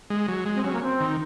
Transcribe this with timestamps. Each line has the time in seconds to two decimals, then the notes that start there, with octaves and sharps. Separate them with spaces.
0.10 G#3
0.28 F#3
0.46 G#3
0.55 C4
0.64 F#3 C#4
0.73 A#3
0.82 C4
1.00 D#3